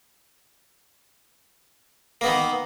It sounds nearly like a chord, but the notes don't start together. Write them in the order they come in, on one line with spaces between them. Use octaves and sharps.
A#3 B3 D#3